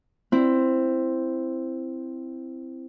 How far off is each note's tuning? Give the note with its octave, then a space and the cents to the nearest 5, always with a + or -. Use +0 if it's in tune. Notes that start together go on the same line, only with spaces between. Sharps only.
C4 +0 E4 +10